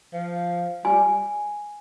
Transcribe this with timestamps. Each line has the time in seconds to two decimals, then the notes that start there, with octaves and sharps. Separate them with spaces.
0.13 F3
0.85 G3 G#5